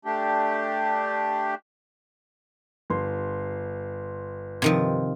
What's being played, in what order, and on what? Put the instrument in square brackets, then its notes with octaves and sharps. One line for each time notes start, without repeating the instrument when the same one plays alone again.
[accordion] A3 D4 G4
[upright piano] G1 C6
[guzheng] C3 D#3 F3